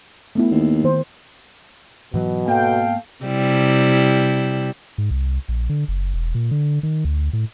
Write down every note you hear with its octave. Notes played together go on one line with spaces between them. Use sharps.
A3 B3 E4
D#2
D#3 C5
G#2 B2 E3 F#3
G#2 A#3 B3 A4 F5 G5
C3 G3 E4
G#2
C2
A#1
D3
F#1
E1
A#2
D3
D#3
D2
A2